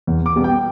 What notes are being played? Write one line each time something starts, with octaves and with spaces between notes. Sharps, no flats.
E2
D6
B2 G3 B3
G5